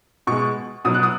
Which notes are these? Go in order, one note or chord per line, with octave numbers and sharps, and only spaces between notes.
B2 G#3 C#6
B2 F#3 D#6
F#6
D#6